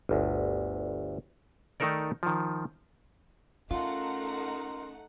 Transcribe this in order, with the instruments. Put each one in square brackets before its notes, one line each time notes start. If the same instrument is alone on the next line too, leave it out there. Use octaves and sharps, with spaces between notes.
[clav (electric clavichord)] G1 D2
D#3 A3 D#4 A4 A#4 D5
D#3 F3
[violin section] A3 D#4 F#5 [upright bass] C#4 [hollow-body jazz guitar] F4 [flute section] A#4 A#5 C6